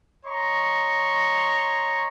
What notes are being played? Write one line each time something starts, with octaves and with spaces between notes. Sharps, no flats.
C#5 D#5 A#5 C6 C#6